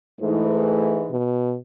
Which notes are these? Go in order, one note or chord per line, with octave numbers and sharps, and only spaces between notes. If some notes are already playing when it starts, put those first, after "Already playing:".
G#2 E3 A3
B2